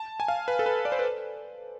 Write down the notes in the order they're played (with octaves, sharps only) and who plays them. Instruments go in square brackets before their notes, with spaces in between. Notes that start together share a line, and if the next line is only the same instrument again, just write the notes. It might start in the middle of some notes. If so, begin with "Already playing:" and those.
Already playing: [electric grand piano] A5
G#5
F5
B4
A4
B4
D5
C5
B4